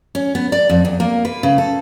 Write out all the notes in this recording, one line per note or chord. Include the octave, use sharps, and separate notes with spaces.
C#4
B3
D5
F2
E2
A#3
B4
C#3
A4